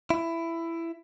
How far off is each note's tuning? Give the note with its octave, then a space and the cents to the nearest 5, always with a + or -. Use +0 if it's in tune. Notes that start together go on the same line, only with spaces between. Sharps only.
E4 +15